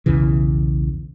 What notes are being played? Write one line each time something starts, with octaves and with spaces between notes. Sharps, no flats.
B1 E2 C#3 E3